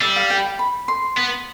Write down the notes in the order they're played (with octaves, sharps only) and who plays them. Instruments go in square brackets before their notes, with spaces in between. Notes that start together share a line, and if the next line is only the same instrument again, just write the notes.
[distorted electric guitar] G3 [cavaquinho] E5
[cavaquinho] F5
G5
B5
C6
[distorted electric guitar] B3